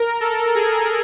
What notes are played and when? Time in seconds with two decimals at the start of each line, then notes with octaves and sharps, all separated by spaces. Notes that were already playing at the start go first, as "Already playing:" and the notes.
Already playing: A#4
0.21 A4
0.55 G#4